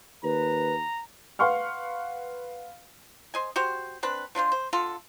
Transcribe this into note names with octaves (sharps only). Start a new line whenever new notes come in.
D#2 B4 A#5
B4 F5 F#5 C6 C#6 F6
C5 D#5 G#5
F#4 G4 C5
C4 D4 B4
F3 D4 F4 C5
C5
D3 F4 A4